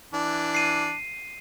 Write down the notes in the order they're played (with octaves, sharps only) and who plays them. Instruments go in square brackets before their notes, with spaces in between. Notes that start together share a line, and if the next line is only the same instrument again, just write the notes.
[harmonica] E3 D4
[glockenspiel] C7 D#7